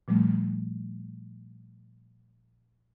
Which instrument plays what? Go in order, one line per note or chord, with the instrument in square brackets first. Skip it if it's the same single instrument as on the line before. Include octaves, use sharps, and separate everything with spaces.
[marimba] A#2 F3 G3 A3